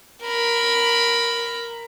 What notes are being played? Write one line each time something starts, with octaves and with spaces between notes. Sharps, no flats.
A#4 B5